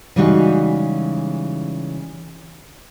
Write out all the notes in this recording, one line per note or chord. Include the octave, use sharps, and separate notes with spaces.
C#3 E3 G3 G#3 D#4 F#4